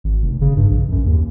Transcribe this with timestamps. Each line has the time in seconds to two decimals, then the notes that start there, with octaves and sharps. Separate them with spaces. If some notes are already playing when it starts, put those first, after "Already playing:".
0.04 G#1
0.23 F1
0.41 C#3
0.57 G2
0.70 A#1
0.92 F#2
1.06 D#2